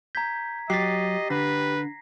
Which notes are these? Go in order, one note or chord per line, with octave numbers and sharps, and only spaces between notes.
A#5 G6 G#6 B6
F#3 G4 D#5 A6 B6 C7
D3 B4 A#6